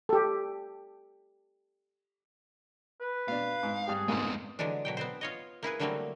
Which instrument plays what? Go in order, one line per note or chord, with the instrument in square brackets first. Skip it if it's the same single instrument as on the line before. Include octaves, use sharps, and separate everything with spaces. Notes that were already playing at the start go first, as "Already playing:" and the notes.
[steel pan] G4 A4
[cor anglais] B4
[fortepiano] B2 D4 [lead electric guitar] F5
[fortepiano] G#2
[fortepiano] G2 G4 [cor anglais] G#4
[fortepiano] A#1 F2 G#2 [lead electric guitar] G#3 B3
[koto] D3 E3 F#3 G#3 D4
B2 F#3 G5
B3 C4 C5
F4 C#5 D#5
A#3 E4 G#4 B4
D3 F#3 G3 A3 A#3 C4